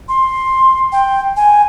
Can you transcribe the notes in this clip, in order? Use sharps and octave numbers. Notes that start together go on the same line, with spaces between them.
C6
G5
G#5